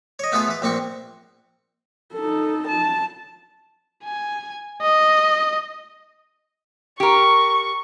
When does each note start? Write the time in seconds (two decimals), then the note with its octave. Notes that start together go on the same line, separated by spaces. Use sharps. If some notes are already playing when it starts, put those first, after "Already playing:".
0.19 C#5 D#5
0.32 A3 B3 F4 G#4 A4
0.48 E3 B4
0.62 A#1 A#3 C4 C#6
2.14 D#4 A4
2.68 A5
4.04 G#5
4.81 D#5
7.00 G4 A#4 C#6